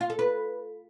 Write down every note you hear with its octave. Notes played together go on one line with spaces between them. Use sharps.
F4
A4
B4